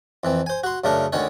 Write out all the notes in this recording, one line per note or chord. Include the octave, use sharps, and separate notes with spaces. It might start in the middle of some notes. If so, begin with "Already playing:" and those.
F2 E3 C4
C5 G#5
F#4 C6
F#2 C#3 A3 D4 A#4
D2 D3 D#3 C#4 C#5